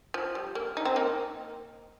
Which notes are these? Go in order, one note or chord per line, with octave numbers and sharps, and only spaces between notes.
F3
G3
A#3
D#4
C4
A#3 D#4